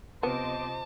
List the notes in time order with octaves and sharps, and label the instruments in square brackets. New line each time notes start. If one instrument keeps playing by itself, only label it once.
[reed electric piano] C3 C4 F4 [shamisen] B3 [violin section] C5 D#5 D6 [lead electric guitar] A5